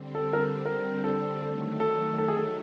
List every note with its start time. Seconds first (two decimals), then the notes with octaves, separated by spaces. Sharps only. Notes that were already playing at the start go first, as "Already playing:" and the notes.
Already playing: D3 G3 C4
0.15 A4
0.33 A#4
0.40 A4
0.65 A#4
1.04 A4
1.42 D#3 F#3 A3 A4
1.80 A4
2.18 A4
2.28 G#4
2.37 A4